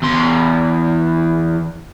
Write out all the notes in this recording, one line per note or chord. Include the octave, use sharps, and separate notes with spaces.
E2 C6